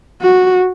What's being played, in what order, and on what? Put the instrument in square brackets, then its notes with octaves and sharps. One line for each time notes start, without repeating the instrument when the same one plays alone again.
[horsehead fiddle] F#4